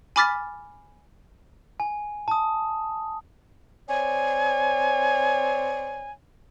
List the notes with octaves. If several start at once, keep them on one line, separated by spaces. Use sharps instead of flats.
G#5 B5 D6 F6 A6 B6
G#5
A5 D#6
C4 C#5 D5 G#5